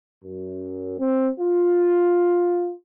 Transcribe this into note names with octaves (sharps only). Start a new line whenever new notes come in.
F#2
C4
F4